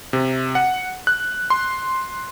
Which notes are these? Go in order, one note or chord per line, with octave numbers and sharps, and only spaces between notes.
C3
F#5
F#6
C6